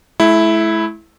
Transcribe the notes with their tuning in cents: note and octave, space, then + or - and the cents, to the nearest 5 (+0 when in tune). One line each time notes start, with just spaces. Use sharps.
A3 -45 E4 +0